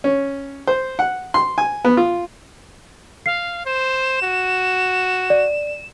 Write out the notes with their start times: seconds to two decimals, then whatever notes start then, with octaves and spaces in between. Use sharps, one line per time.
0.04 C#4
0.67 C5
0.99 F#5
1.34 C6
1.58 G#5
1.85 B3
1.97 F4
3.26 F5 C7
3.66 C5 E7
4.22 F#4
5.30 D5